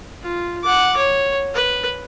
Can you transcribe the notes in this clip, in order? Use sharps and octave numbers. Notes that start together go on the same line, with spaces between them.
F4
F#5 D6
C#5
B4